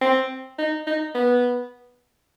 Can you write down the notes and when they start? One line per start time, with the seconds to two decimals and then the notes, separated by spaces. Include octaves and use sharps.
0.02 C4
0.59 D#4
0.87 D#4
1.15 B3